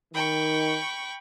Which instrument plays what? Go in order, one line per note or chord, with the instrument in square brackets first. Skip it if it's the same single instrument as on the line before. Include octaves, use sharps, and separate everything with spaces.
[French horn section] D#3 [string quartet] G5 B5 C#6